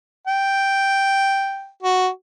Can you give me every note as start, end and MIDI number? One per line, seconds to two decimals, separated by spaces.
0.27 1.69 79
1.83 2.08 66